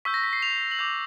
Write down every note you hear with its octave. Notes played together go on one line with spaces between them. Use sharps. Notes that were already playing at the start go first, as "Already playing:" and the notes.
C#6 E6 G6 B6
A#6
B6
C7
F7
F#7
D6 G6 F7